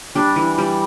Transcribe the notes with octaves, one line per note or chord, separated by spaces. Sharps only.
G3 D4
E3
G3